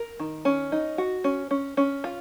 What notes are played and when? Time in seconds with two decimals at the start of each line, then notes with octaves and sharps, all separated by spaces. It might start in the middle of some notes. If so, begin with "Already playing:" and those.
Already playing: A#4
0.19 D#3
0.45 C#4
0.72 D#4
0.98 F#4
1.24 C#4
1.51 C#4
1.77 C#4
2.04 F4